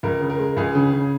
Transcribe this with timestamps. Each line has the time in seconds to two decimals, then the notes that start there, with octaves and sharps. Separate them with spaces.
0.03 C#2 A#4
0.21 C#3
0.30 A#4
0.39 G#3
0.57 C#2 G#4
0.75 C#3
0.93 C#3